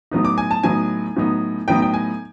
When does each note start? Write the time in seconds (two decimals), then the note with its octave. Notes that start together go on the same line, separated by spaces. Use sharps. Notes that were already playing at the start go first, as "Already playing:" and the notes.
0.11 A2 F#3 B3 D#4
0.25 D6
0.38 G#5
0.51 A5
0.63 A2 F#3 B3 D#4 G#5
1.16 A2 F#3 B3 D#4
1.68 A2 F#3 B3 D#4 G5
1.82 G5
1.94 G#5